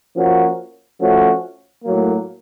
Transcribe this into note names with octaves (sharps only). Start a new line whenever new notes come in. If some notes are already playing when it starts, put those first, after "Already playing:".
F3 A#3 C#4 F#4
F3 A3 C#4 F#4
A2 F#3 A#3